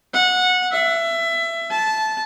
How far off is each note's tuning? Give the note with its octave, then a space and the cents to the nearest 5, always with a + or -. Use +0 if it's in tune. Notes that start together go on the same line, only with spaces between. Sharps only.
F#5 -20
E5 +20
A5 -15